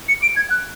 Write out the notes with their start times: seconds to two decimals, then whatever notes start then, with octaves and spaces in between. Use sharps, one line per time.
0.09 C#7
0.22 D7
0.36 G#6
0.50 F#6